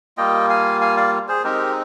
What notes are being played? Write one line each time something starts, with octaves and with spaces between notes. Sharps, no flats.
G3 A#3 F4 D#5 G5
F5 G#5
F5 G#5
D5 F5
G#4 C5
G#3 C4 D#4 G4 A#4